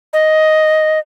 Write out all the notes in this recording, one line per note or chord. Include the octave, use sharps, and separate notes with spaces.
D#5